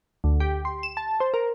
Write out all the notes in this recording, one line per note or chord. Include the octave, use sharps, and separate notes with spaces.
D2
G4
C6
E7
A5
C5
A#4